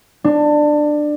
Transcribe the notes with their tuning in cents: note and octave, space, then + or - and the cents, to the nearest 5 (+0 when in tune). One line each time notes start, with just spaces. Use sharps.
D4 +20